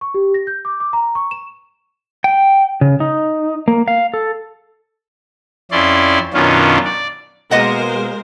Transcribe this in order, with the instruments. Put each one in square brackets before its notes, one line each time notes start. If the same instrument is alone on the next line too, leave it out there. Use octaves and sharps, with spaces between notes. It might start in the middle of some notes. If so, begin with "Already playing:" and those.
[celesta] C#6
G4
A#6
G6
D6
D6
A#5
C#6
E7
[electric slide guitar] G5
C#3
D#4
A#3
F5
A4
[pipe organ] F2 C#4 E4 D5 C6
F#2 B2 D#3 C#4 D4 F4
D5
[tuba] B2 [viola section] G#3 A#4 C5 [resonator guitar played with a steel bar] A#3 D#5 F#5